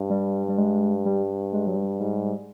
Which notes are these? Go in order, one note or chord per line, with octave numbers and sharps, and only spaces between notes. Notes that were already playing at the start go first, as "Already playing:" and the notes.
Already playing: G2
G3
G3
G#3
G3
G#3
F#3
G3
G#2 G3